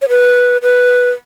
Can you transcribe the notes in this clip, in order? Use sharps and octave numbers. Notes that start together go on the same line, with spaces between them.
C#5
B4
B4